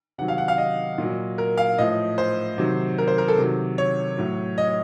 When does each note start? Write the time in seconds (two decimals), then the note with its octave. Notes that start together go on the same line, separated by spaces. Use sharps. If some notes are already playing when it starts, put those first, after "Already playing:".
0.18 C3 D#3 F#3 F#5
0.28 F5
0.38 F#5
0.48 F5
0.58 D#5
0.98 A#2 F#3
1.38 A#4
1.57 F5
1.78 A2 F3 D#5
2.18 C5
2.58 C3 D#3 F#3
2.98 A#4
3.08 C5
3.18 A#4
3.28 A4
3.38 C3 D#3 F#3
3.78 C#5
4.18 A2 F#3
4.58 D#5